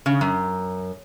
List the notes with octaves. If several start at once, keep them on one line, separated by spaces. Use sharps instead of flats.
C#3
F#2